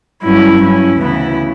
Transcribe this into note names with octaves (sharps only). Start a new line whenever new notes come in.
G2 F#3 C#4 E4
G2 F#3 C#4 E4
D2 C#3 E3 B3 E4